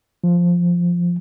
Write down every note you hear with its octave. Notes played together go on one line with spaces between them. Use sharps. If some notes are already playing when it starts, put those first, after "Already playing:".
F3